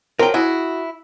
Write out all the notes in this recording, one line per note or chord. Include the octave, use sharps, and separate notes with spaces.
F3 F#3 A#4 G5
E4 F#4 G#4